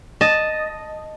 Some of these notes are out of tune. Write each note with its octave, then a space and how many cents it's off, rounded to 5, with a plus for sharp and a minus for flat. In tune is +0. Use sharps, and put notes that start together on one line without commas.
D#5 -5 A5 +0